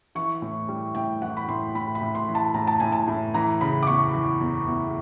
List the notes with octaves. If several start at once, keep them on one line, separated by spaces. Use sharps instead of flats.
E3 C#6
A2
G3
A2 G5
E3 F#5
B5
A2 C6
A2 B5
B5
A2
C6
E3
A5
A2 A#5
A5
A2 G#5
A5
A2
E3 A#5
C#3 B5
D6
E2 C#6
E3
E2
E2